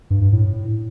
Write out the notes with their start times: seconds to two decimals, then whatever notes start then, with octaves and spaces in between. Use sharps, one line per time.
0.10 G2
0.21 G2
0.33 A2